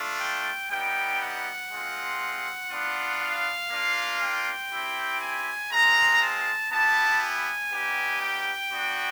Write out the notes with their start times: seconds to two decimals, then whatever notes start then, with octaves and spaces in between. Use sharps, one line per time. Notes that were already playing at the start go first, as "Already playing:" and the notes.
Already playing: A3 D4 F4
0.20 G5
0.71 G3 B3 D#4 G5
1.21 F#5
1.70 G#3 C4 F4
2.71 B3 D4 F4
3.21 F5
3.71 A#3 D4 F4
4.21 G5
4.72 C4 E4 G4
5.21 G#5
5.71 G#3 C4 F4 A#5
6.21 A5
6.71 B3 E4 G4 A5
7.21 G#5
7.72 G3 B3 D#4 G4
8.21 G5
8.71 B3 D4 F#4